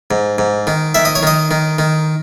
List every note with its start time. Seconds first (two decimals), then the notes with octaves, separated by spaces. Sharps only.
0.11 G#2
0.38 G#2
0.67 D#3
0.94 D#3 E5
1.05 D#5
1.15 C#5
1.23 D#3 D#5
1.51 D#3
1.78 D#3